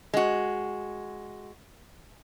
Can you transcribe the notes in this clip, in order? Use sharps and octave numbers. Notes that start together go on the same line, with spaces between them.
G#3 F#4